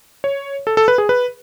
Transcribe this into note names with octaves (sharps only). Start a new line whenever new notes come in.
C#5
A4
A4
B4
G#4
B4